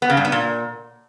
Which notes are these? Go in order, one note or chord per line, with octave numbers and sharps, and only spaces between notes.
B3
C#3
G2
B3
A#2